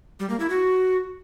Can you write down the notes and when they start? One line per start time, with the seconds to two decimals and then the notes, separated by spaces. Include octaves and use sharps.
0.20 G3
0.30 A#3
0.40 E4
0.50 F#4